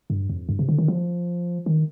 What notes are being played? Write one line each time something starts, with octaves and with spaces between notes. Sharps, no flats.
G2
F2
G2
C3
D3
D#3
F3
D#3